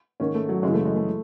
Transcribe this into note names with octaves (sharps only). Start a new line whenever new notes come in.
G#2 D#3 C#4
A3
F#3
F#2 C#3 E3 G#3
A3
G#3
A3